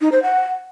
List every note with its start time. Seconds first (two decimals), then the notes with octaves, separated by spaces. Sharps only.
0.01 D#4
0.12 C5
0.23 F#5